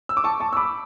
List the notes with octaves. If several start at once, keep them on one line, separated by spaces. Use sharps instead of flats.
E6
D6
A5 C#6
A5 C#6
E6
B5 D6